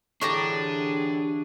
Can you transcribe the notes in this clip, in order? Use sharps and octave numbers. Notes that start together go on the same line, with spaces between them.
A2 D3 E3 G3 D4 G#4 A#5 C#6